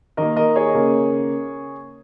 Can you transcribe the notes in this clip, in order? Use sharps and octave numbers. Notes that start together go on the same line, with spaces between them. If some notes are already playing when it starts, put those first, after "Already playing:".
D#3 A#3 A#4 D#5
A#4 D#5
G#4 C#5
C#3 A#3